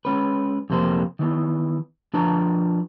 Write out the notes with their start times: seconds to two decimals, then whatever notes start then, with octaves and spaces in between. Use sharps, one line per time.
0.05 G#3 C#4 B4
0.70 F2 C3 A#3 C5
1.19 D#3 E3 B3
2.14 F3 D4 B4 A#5